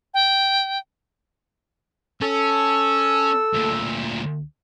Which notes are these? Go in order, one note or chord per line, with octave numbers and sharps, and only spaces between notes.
G5
C#4 A4 E6
D2 A#2